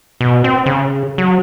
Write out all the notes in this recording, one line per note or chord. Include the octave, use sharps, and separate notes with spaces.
B2
C4
C#3
F#3